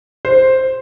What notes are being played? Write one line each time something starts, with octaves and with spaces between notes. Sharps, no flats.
C5